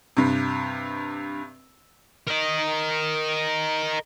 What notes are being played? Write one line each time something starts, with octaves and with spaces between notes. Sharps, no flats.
G2 C3
A#4 D#5